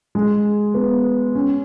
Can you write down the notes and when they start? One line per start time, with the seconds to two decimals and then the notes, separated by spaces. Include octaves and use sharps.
0.15 G#3
0.74 B3
1.35 C#4